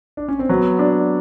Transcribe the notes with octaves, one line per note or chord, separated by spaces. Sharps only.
D4
C#4
C4
F#3 B3
D4